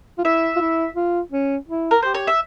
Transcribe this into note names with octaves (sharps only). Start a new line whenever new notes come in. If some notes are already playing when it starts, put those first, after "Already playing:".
F4
E4 E5
F4
E4
F4
C#4
E4
A#4
G4 C5
C#5
E5